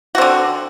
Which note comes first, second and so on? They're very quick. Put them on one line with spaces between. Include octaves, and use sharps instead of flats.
F#4 C4 D3